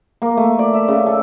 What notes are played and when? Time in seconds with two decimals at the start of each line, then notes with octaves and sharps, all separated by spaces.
0.22 A#3
0.37 A3
0.59 D5
0.74 E5
0.88 C#3
1.06 A4